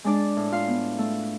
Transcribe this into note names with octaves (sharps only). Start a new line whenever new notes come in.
G#3 D4 D5
A2
F4 F5
B3
A3